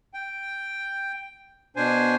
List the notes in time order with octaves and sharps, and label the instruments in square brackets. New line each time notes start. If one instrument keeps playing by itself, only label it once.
[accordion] G5
B2 D4 C5 G#5